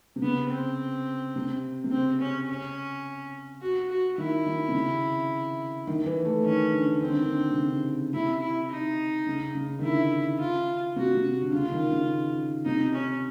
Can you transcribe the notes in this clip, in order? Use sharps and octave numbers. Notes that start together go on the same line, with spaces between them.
C3
C#3 B3
C4
C3
C3
C#3 C4
C#4
C#4
F#4
F#4
D#3 E4
D#3
C3
C#3
D#3
E3
A3
D#3 C#4
D3
D3 C4
D#3
D3
C3
C#3
C3 E4
E4
D#4
C#3
C#3
D#3
D3 E4
F4
C3 F#4
C3
D3
C#3 F4
D#3
C#3
C3 D#4
C#4